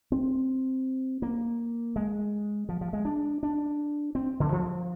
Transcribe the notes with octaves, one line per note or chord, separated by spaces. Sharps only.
C4
A#3
G#3
F3
F3
G#3
D4
D4
C4
D3
F3